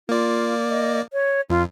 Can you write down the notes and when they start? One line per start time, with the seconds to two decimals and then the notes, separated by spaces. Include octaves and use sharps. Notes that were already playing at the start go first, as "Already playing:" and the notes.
0.09 A#3 F4 D5
0.70 D#5
1.13 C#5
1.50 F2 F4